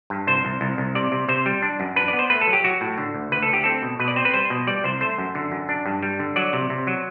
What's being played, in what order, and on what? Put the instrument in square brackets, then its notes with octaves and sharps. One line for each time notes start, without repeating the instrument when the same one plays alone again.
[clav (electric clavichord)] G2
C2 C5
C2
C2
C2
C3 D5
C3
C3 C5
G3
D4
F#2
D4 B4
D5
B3
C5
A3 B4
A4
F#3
G4
F#3 F#4
A2
D3
D2
D2 B4
A4
D2 G4
C4 A4
B2
B2 B4
D5
C4 C5
B4
G3 C5
B2
G3 D5
C2 C5
A3 C5
F#2
D3
F#2
D4
G2
G3
D3
F#3 D5
C3
C3
F#3